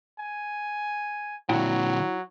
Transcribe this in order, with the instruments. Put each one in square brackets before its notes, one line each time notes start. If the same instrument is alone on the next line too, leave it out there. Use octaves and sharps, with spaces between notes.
[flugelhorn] G#5
[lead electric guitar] A#2 D3 [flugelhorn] F#3 [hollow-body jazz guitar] E4 F#5 G5